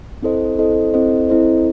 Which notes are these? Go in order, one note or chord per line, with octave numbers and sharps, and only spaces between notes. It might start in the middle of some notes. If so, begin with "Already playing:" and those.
C4 E4 A4 C5 D#5
C4 E4 A4 C5 D#5
C4 E4 A4 C5 D#5
C4 E4 A4 C5 D#5